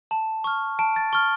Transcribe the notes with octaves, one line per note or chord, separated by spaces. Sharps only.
A5
C#6 F6
A5 D7
A6
C#6 F6 G7